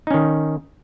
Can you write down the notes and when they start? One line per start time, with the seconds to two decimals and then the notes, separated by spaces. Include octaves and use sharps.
0.07 D#4
0.11 C#4
0.14 D#3